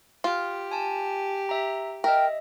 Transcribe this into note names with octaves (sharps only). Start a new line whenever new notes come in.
F4 G4
G#5 A5
E5 A#5
A#4 D#5 E5 G5